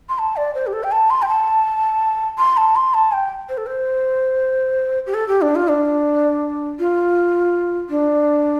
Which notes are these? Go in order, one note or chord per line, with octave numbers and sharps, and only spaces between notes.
C6
A5
D5
C5
G4
A4
G5
A5
C6
G5
A5
C6
A5
C6
A5
G5
C5
A4
C5
G4
A4
G4
D4
F4
D4
F4
D4